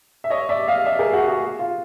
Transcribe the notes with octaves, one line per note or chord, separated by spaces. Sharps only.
E5
C#5 D#5
D5 E5
D#5 F5
D5 E5
G#4 A#4
F#4
F#4 G#4
F4